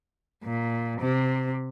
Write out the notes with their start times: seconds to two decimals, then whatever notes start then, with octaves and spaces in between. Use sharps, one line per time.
0.44 A#2
1.00 C3